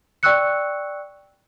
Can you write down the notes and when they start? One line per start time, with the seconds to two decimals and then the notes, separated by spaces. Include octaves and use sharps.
0.23 D5 G5 C#6 E6 F#6 C#7